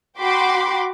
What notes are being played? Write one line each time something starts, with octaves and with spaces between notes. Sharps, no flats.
F#4 G5 B5 C6 D6